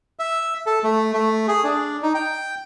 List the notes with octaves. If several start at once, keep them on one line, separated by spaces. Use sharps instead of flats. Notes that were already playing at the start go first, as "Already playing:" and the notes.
E5
A4
A3
A3
G#4
D4
D#4
G5